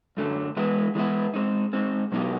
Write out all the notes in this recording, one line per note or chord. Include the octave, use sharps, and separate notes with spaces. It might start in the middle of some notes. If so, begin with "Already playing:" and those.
F#2 D3 F#3 A3
E3 G#3 B3 E4
E3 G#3 B3 E4
G#3 C4 D#4
G#3 C4 D#4
B2 F#3 B3 D#4 G4